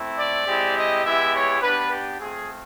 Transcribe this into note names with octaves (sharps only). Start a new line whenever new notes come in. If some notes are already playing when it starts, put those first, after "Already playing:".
Already playing: A3 C4 E4
D5
G#3 C4 E4 G4
D#5
G#3 B3 E4 G4 E5
C#5
B3 D4 G4 B4
G4
A3 C4 F4 G#4